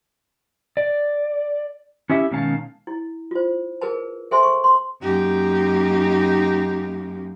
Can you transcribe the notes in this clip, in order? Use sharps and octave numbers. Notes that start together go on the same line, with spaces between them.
D5
C#4 E4 G4 E5
B2 D#3 G#3 C#4 F5 A5
E4
F4 C5
G#4 A#4 B4 A5
G#4 A4 C5 E5 G#5 C6
C#6
C6
F#2 A#3 D#4 G4